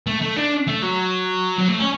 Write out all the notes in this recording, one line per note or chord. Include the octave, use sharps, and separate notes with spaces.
A3
A3
D4
A3
F#3
F#3
A3
C#4